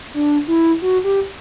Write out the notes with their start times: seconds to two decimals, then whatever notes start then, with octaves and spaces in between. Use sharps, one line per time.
0.14 D4
0.48 E4
0.82 F#4
1.04 G4